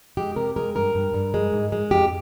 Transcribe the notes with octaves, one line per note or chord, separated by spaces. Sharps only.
G#3 G4
C3 A#4
G#3 A#4
G2 A#4
G2
G2
G#3
G#2
G#3
F2 G4